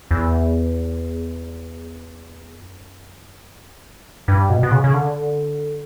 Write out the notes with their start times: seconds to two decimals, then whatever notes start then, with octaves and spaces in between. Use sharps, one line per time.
0.11 E2
2.55 F#2
4.28 G2
4.50 B2
4.63 B2
4.71 C#3
4.84 C#3
4.94 D3